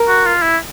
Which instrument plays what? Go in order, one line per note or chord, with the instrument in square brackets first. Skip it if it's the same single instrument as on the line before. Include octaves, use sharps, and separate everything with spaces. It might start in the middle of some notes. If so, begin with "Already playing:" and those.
Already playing: [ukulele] A#4
[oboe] F#4
F4
E4